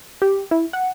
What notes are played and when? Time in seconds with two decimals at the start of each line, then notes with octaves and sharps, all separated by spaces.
0.22 G4
0.51 E4
0.73 F#5